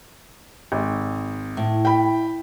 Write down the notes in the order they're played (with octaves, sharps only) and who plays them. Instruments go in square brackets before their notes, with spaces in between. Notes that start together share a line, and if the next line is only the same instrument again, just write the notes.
[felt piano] G#1
[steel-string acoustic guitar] A2
[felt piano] G5 B5